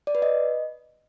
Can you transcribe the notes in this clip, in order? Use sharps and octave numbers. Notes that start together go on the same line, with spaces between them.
D5
B4
D#5